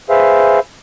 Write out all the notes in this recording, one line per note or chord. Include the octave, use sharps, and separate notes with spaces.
G#4 B4 C5 E5 F5